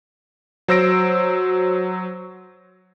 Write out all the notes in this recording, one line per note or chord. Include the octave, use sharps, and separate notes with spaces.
F#3 C5 E6 A#6 D7